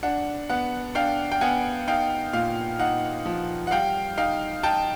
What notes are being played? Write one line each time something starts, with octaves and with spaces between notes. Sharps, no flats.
D4 F#5
B3 F#5
D4 F5 G5
G5
B3 F#5 G#5
D#4 F5 G5
A#2 F5
D#4 F#5
F3
F#5
G3 F5 G5
D#4 F5 G5
D#4 G5 A5